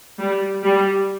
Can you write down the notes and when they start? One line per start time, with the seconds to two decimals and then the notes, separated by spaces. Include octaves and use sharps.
0.20 G3
0.64 G3